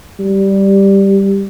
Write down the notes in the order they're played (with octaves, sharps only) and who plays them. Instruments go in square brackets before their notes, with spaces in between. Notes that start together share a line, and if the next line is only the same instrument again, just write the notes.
[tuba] G3